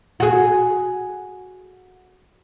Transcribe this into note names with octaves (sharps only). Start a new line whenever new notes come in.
F#4 G#4